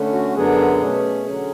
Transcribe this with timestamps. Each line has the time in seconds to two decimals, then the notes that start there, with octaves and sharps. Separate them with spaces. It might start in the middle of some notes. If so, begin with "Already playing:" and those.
Already playing: D3 A3 C#4
0.13 F#4
0.36 F#2 D3 F#3 B3 D4 G#4
0.81 B2 A3 C#4
1.26 D3 F#3 C#4